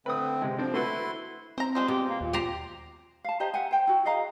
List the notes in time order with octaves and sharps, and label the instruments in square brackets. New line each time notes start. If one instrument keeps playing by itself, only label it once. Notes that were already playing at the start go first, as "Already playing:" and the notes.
[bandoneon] D3 A3 C4 [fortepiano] B4 D#6
[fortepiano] C3 G#3
[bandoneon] F3 [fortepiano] C4 D4
[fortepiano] A3 F#4 B4 [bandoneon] E4 C6
[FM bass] C4 [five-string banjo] C5 A#5
[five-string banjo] F3 G3 G#3 [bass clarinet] C5
[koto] B2 [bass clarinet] G4
[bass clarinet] A#3
[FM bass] D#2 [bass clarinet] A#2
[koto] G4 C5 A#5
[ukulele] F5 A5
G4 C5 D#5 A#5
E5 F#5 G#5
C5 G5
E4 F#4
G#4 D#5 F5 A#5